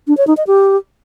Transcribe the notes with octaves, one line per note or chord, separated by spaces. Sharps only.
D4
C#5
D#4
D#5
G4